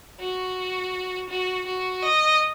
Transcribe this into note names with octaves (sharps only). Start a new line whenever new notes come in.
F#4
F#4
F#4
D#5